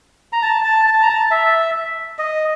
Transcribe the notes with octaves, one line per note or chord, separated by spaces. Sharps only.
A#5
A5
A5
A5
A#5
A5
E5
D#5